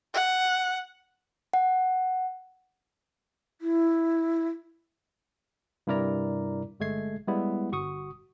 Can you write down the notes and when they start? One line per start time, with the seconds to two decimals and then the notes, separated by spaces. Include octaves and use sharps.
0.14 F#5
1.54 F#5
3.61 E4
5.87 G2 C3 E4 A#4 D5 A#5
6.80 G1 G#3 A3 G#6 C7
7.27 G3 G#3 B3 E4
7.72 G1 F#4 C#6 D#6